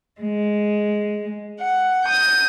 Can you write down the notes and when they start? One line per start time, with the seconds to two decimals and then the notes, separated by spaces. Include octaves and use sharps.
0.20 G#3
1.60 F#5
2.04 D#6 G6